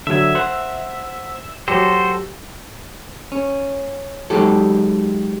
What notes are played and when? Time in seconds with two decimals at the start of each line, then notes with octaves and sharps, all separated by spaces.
0.07 D3 F#3 E5 G#6
0.35 C5 F#5 E6
1.68 F#3 F#4 G4 A4 C5
3.32 C#4
4.30 F#3 G#3 D#4 G4 A4